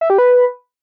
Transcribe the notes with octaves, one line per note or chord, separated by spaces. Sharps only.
E5
G4
B4